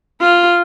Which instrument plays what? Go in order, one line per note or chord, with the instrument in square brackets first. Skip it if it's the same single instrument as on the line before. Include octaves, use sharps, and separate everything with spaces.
[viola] F4